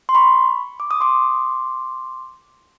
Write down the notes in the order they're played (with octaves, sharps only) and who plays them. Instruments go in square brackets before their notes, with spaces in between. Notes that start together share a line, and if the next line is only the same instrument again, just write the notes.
[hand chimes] C6
B5 C#6
D6
D#6
C6 D6